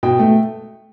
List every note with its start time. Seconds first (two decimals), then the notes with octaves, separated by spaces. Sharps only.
0.03 B2 G5
0.19 A3